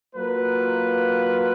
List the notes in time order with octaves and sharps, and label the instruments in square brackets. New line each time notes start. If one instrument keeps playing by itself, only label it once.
[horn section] F#3 A#3 F4 B4